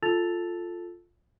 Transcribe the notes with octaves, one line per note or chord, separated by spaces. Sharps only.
F4 A4 A5 E6 A6 F7